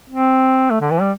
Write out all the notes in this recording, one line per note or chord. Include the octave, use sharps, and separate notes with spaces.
C4
A3
D3
E3
G3